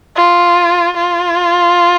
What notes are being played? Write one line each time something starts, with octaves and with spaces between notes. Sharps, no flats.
F4
F4